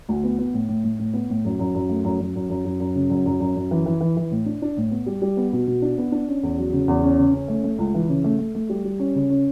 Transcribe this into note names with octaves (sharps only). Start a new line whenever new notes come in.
D2
B3
B3
A2
A2
A2
A2
B3
A2
F#2
F#2
F#2
A3
F#2
F#2
F#2
F#2
F#2
F#2
C#3
F#2
F#2
F#2
F#2
E3
E3
E3
E3
A2
D4
D4
A2
B3
G3
G3
B3
B2
B2
D4
B3
D4
C#4
E2
F#3
C#3
E2
C#4
C#3
C#4
A3
A3
C#2
E3
C#3
A3
A3
A3
G3
G3
C#4
C#3
C#4